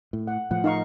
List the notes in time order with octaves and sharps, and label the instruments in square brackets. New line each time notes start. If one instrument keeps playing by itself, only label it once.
[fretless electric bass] A2
[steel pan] F#5
[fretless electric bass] A2 F3 [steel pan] F#5
[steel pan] D#4 F5 C#6